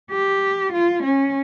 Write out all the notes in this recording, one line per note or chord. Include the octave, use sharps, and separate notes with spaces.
G4
F4
C#4